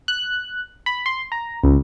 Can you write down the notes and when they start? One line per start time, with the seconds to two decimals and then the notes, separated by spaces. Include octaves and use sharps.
0.08 F#6
0.86 B5
1.06 C6
1.32 A#5
1.64 C#2